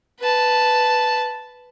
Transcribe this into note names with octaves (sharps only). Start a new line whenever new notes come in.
B4 A5